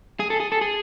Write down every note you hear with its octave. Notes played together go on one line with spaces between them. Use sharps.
G#4
A4
G#4
A4
G#4